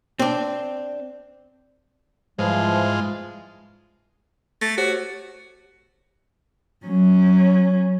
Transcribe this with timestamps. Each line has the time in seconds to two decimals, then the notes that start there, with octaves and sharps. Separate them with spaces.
0.19 C4 D4
2.39 G#2 E3 F3 G3 G#3 F4
4.61 A3 A6 A#6
4.78 F#4 G4 C5 C#5
6.85 F#3 C#4